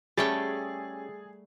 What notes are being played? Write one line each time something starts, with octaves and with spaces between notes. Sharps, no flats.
G3 A3 C#4 G4 G#4 G5 A6